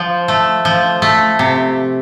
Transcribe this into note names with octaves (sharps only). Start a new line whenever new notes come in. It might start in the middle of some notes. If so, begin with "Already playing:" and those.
Already playing: F3
A3
F3
A3
C3